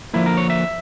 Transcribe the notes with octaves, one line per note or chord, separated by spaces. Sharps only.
D3 F3 A#3 E4
A#4
C#5
E5